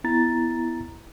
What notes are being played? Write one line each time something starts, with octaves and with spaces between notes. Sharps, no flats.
B3 E4 A#5 A6